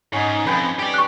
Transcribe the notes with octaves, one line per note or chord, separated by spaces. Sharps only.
G#2 C#4 D#4
F2 B4 G5 G#5
G4 D5
C#6 F#6